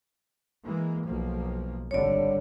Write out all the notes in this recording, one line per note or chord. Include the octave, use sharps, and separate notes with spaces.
E3 G#3 A#3
B1 F3 A#3
G#1 D3 G3 C#5 D5